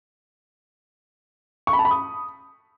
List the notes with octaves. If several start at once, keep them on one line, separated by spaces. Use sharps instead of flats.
C#6
B5
A5
B5
D#6